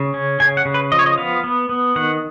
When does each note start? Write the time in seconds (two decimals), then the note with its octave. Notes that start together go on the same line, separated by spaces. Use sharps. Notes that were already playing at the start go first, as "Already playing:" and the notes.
Already playing: C#3
0.14 C#4
0.40 C#3 G#5
0.57 F#5
0.65 C#3
0.74 B4
0.92 F3 D#5
0.99 C#5
1.06 D#5
1.18 B3 F5
1.44 B3
1.69 B3
1.96 D#3 F#5